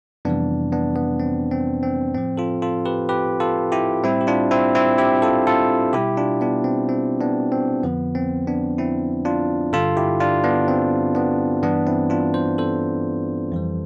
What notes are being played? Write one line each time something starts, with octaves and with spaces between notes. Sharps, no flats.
F2 C3 E3 G3 B3 D4
B3 D4
B3
C4
C4
C4
A2 F3 C4
F4 A4
F4 A4
G4 B4
G4 B4
F4 A4
E4 G4
A2 G3 C4 E4
G4
D4 F4
C4 E4
C4 E4
E4 G4
F4 A4
F4 A4
B2 G3 E4 G4
D4 F4
B3 D4
C4
C4
B3 D4
C4
F2 D3 F3 B3
C4
B3 D4
C4 E4
D4 F4
G2 D3 G3 F4 A4
E4 G4
D4 F4
B3 D4
C4
B3 D4
G2 E3 G3 B3 D4
C4 E4
D4 F4
C5
A4 C5
F2 E3 G3